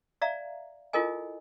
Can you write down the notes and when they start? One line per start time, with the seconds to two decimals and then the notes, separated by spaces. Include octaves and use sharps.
0.22 D5 E5 F5 A#5
0.93 E4 F4 A4 A#4 D#5 G#5